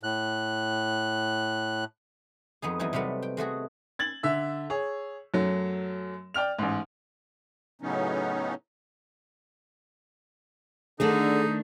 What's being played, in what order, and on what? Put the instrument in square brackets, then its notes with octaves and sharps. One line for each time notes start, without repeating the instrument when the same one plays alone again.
[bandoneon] A2 F#6
[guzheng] F2 B3 D#4 G#4
E2 E3 G3 D#4 G#5
C3 F#3 G3 A3 B3
G5
G#3 A3 F#4 G#4
[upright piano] G#6 A6 F#7
D3 E5 E6
G#4 C#5
F#2 F#3 A3
D5 G5 F6 F7
A1 G#2
[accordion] A2 C#3 F#3 B3 C#4 D#4
[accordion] D3 [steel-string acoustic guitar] D#3 A3 D4 [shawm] D#4 [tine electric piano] G#4 A4